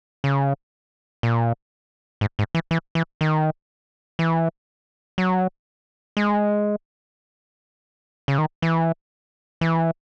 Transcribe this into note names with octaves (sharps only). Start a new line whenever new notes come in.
C#3
A#2
G#2
G#2
E3
E3
E3
D#3
E3
F#3
G#3
C#3
D#3
E3
E3